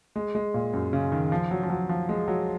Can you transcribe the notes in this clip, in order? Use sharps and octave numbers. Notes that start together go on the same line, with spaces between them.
G#3
G#3
A#2
F#2
C#3
D#3
F3
F#3
F3
F#3
F3
G#3
F#3